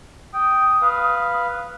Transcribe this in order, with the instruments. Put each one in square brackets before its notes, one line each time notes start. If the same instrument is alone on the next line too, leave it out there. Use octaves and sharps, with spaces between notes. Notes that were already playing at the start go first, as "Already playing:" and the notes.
[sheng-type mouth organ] G5 [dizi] D#6
[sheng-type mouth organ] B4 F5